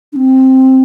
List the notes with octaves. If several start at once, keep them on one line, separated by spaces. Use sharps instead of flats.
D4
C4